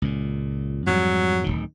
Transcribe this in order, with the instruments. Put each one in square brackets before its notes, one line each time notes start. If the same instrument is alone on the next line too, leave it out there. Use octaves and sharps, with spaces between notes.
[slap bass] C#2 A#2
[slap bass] F2 G#2 G3 [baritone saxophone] F#3
[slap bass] D1 G1 D#3